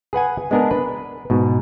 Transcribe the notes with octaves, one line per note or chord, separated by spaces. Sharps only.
G#4 B4 F#5 G#5
G#3 B3 D4 G#4 A#4
B4
G#2 B2